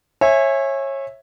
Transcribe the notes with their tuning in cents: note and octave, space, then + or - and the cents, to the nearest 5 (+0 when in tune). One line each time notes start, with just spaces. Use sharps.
C#5 -25 E5 +0 G#5 +0